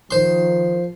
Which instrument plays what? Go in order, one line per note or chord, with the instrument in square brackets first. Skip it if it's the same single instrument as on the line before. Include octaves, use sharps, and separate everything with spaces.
[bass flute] D#3 [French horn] F3 [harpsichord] C5 C6